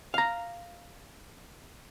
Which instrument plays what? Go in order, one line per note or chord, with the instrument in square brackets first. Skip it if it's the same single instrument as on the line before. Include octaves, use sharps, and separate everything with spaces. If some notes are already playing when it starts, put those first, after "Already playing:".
[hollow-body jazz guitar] F5 A#5